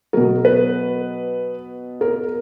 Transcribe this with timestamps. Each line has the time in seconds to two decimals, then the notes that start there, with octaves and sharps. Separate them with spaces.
0.13 B2 F#3 A#4
0.45 B4
2.01 A#4